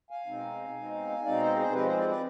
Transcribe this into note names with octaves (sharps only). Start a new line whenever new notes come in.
F5 G#5
B2 G#3 C4 D#4
B2 G#3 C4 D#4
B2 G#3 C4 D#4 D5 F5
C5 D#5
G#4 C5
F3 G#3 C4 G4 B4
G#4 C5
B4 D5
B4 D5